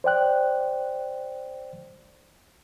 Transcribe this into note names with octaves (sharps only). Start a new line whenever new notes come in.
C5 D5 G5 F#6